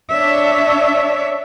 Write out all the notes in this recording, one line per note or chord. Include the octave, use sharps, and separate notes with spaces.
D4 C#5 E5